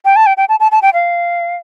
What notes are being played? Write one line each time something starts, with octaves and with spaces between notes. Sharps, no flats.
G5
A5
G5
G5
A5
A5
A5
G5
F5